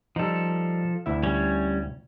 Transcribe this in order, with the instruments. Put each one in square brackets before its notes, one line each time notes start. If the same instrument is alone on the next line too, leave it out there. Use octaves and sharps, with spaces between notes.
[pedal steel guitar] F3 A4 [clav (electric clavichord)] G3 D#4
[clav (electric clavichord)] D2 E4 E5
[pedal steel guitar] G3 C#4 C#5